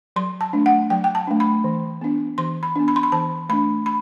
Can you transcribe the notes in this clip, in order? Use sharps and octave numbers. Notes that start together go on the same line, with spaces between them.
F#3 C6
A5
A3 D4
F#5
F#3 G5
G5
A5
A3 D4
B5
E3
B3 D4
E3 C6
B5
B3 D4
B5
C6
B5
E3 A5
A3 D4 B5
B5